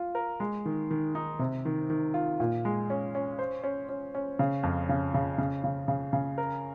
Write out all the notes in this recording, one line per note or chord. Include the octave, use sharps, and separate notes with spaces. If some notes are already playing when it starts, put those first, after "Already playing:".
Already playing: F4
A#4
G#3
D#3
D#3
D#4
C3
D#3
D#3
F4
A#2
G#3
C#4
C#4
C5
C#4
C#4
C#4
C#3
F2
C#3
C#3
C#3
C#3
C#3
C#3
A#4